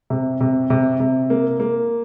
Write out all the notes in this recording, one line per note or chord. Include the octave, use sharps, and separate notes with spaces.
C3
C3
C3
C3
A#3
A#3